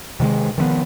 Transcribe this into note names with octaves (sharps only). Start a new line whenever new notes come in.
C3 D#3 G3 G#3
D#3 F3 A3 B3